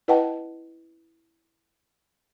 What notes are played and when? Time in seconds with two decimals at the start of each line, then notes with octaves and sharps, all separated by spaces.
0.08 E4 B4 D#5 F#5 G5 A5